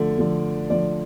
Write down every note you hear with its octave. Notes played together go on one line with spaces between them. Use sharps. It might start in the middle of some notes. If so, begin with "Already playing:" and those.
Already playing: D3 F3 A3 D5
D3 F3 A3
D3 F3 A3 D5